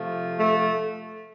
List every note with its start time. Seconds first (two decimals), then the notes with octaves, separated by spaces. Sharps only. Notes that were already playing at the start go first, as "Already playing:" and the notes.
Already playing: C3 F3 A3
0.36 A3